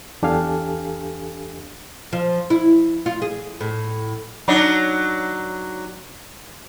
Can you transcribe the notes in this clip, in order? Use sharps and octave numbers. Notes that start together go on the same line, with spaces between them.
E2 D4 G4 A4 F5 G#5
F3
E4
F4
G#4
A2
F#3 D4 D#4